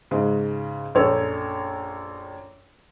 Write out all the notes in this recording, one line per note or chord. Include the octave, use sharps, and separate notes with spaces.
G#2 C#3
A#1 F#2 A4 C#5